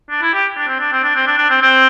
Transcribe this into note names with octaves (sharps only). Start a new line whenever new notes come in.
D4
E4
G4
D4
C4
D4
C4
D4
C4
D4
D4
C4
C4